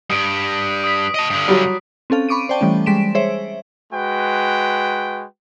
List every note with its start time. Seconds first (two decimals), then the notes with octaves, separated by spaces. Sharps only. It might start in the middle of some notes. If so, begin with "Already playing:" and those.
0.10 G2 D#6 D7
0.84 D#6 B6
1.14 D#5 A5
1.30 G2 D3
1.48 F#3 G3
2.10 C4 C#4 A4 F5
2.29 B5 C#6 D6 D7 D#7
2.49 C5 D5 G5 A5
2.61 E3 G3 A3 C#4
2.86 G3 G#3 C6 B6 D7 E7
3.15 G#4 C5 C#5 E5
3.92 G#3 F#4 B4 G5